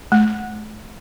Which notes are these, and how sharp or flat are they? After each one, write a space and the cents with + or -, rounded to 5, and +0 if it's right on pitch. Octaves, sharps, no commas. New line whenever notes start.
A3 -45